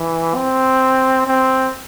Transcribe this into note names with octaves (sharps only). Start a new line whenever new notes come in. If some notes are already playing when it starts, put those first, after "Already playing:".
Already playing: E3
C4
C4